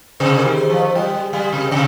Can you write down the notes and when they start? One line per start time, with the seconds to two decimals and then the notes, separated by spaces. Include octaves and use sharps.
0.20 C3 G#4 C5
0.38 G4 A#4
0.45 D#3
0.58 G#4 C5
0.70 F3
0.76 C5 D#5
0.95 G3 D#5 G5
1.14 G3
1.33 G3 F5 G#5
1.52 C3
1.71 C3 D5 F5